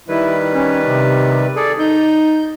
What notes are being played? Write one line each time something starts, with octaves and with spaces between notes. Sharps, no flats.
D#3 G3 E4 B4
C#4
C3
G#4 A4 D5
D#4 G6